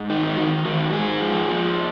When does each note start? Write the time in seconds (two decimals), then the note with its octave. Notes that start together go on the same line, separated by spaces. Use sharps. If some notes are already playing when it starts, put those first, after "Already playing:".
Already playing: G#2
0.10 D#3 D#4
0.25 D#4
0.37 D#3 F#4
0.65 D#3 F#4
0.92 G#2 G#4
1.21 F3
1.48 F3